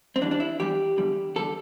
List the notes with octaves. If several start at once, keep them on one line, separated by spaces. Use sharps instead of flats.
C4
E2 E3 G3 D4
D4
E4
E2 E3 G3 G4
E2 D3 G3
E2 D3 G3 A4